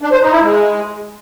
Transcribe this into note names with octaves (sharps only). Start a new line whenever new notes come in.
D4
C5
D#4
E4
G#3